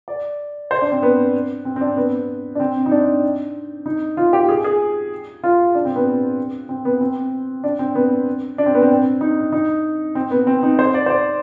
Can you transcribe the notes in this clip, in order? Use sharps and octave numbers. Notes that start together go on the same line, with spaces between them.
D5
C5
D4
C4
B3
C4
C4
D4
B3
D4
C4
D#4
D4
D#4
F4
G4
G#4
G#4
F4
D4
C4
B3
C4
B3
C4
D4
C4
B3
D4
C4
B3
C4
D#4
D#4
C4
B3
C4
D#4
C5
D5
C5
D5